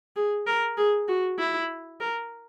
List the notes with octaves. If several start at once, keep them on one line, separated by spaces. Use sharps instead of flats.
G#4
A#4
G#4
F#4
E4
A#4